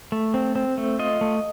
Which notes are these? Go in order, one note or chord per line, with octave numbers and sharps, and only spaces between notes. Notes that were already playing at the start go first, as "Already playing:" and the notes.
A3
C4
C4
A3
F4 D#5
A3